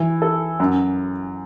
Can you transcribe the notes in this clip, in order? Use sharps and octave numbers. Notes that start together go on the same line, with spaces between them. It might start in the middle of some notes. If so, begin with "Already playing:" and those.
Already playing: E3
A4
F#2